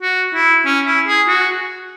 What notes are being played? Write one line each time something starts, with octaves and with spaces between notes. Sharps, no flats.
F#4
E4
C#4
E4
G#4
F#4